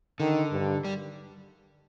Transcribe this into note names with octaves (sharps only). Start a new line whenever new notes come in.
D3 D#3
G2
G3